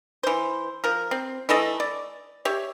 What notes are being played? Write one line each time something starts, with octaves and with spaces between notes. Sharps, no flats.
E3 C5
F3 A#4
C4
E3 A3 A4 D#5
D5
G4 C#5 E5